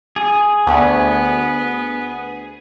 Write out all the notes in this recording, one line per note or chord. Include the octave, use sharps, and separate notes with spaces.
G#4
D2 B3